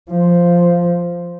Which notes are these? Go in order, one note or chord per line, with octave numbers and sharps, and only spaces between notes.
F3